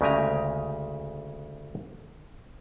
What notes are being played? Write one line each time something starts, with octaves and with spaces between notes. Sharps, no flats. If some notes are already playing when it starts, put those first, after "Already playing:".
D2 C#3 G#3 G4 G#5 A#5